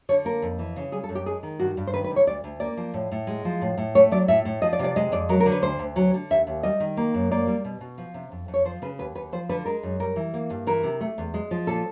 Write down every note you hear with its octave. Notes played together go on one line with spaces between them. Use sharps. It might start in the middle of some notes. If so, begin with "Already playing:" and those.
D3 C#5
A#3 A#4
F2
E3
C#3
G3 G#4
A4
F#2
G4
G#3 G#4
D#3
G2 F#4
G2
C5
D#3 B4
B4
C3
C#5
D2 D5
D2
A#3 D5
F3
A2
A2
G#3
F3
A2
A2
A3 C#5
F#3 D5
A2 E5
A2
F3 D#5
D5
C3
D5
G#3 D#5
F2 D5
F#3 A#4
A#4
D3
B4
D2 C5
D2
F#3
D3
D#2 E5
D#2
G3 D#5
D#3
A#3
F#2
A#3 D5
G3
B2
B2
F3
C3
F2
F2
C#5
F3 C5
C#3 B4
D#2 B4
D#2 B4
F3 C5
D3 B4
G#3 A#4
F#2
G3 A#4
E3
A#3
G2
E3 A#4
C3
A3
E2
G#3
F3
A#2 A4